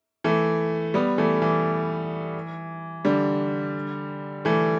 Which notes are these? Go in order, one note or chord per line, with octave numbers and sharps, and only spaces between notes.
E3 A3
G3 B3
E3 A3
E3
D3 G3
E3 A3